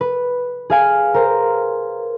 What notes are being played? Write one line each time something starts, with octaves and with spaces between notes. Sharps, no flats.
B4
G#4 F5 G#5
A#4 C5